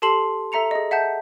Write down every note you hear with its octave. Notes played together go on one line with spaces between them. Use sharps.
G4 A4 A5 C6 C7 F#7
A4 E5 A#5 C#7 F7
G#4 D#5
E5 F#5 A5 G6